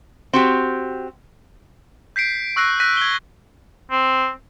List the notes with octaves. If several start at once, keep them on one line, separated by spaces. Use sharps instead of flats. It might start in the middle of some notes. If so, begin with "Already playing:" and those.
C4 F#4 G4
G6 B6 C7 D7
C#6 E6 F#6 A#6 C7 D7
F#6 G6 A#6 B6 D#7
G#6 G7
C4